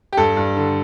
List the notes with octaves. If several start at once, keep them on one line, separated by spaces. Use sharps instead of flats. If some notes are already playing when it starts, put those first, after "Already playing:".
G4
G2 A4
G2
D3